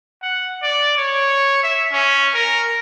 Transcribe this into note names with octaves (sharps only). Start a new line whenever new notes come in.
F#5
D5
C#5
E5
C#4
A#4